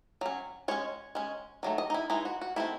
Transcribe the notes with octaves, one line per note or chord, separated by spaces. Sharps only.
F#3 C#4
G#3 C#4 C#5
G#3 C#4
D#3 F#3 A3
D#5
D#4
E4
E3 G#3 D#4 E4
F#4
F#4
D#3 A3 C4 E4